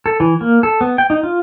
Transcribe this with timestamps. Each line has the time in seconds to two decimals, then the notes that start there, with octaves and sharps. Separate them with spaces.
0.06 A4
0.20 E3
0.41 A#3
0.63 A4
0.81 B3
0.98 G5
1.10 D#4
1.23 F4